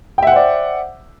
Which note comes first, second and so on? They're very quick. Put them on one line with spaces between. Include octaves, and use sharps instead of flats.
G5 E5 F#5 C5 D5